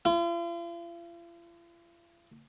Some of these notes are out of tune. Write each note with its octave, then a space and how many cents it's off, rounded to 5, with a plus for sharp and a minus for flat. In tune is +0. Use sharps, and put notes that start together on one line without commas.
F4 -45